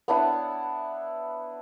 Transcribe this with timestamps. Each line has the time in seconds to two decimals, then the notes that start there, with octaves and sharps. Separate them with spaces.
0.08 B3 D4 E4 F#5